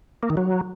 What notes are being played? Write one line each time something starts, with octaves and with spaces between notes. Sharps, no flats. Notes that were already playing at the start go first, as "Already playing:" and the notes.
A#3
D#3
F#3